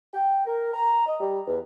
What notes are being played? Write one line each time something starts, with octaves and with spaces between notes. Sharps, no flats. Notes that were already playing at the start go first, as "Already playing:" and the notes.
G5
A#4
A#5
D#5
G3
E2